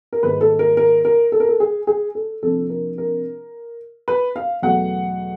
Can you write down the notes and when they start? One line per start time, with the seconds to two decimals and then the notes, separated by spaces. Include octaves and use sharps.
0.13 A#4
0.23 G#2 D#3 G3 A#3 B4
0.41 A4
0.59 A#4
0.77 A#4
1.05 A#4
1.32 A4
1.40 A#4
1.49 A4
1.60 G#4
1.87 G#4
2.15 A4
2.43 C2 C3 F3 A#3 D4 A4
2.69 A#4
2.98 A#4
4.08 B4
4.36 F5
4.62 E2 B2 F#3 A3 F#5